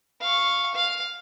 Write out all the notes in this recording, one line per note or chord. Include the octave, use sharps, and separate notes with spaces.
F5 C#6
F5